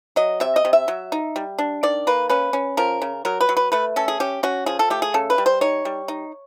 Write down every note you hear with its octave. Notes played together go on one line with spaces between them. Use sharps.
F#3 D#5
C3 E5
D#5
C3
E5
F#3
D#4
G3
D4
D#3 D5
A#3 B4
C#4 B4
C#4
F3 A#4
C#3
F#3 A#4
B4
F#3
B4
A3 B4
C#4 A4
G#4
C#4 G4
C#4 F#4
F3 G#4
A4
A3 G4
G#4
C#3 A4
B4
G3
C5
D#4 C#5
G3
D#4